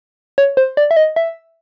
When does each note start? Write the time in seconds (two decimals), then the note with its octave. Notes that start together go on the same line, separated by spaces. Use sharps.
0.38 C#5
0.57 C5
0.77 D5
0.91 E5
0.97 D#5
1.16 E5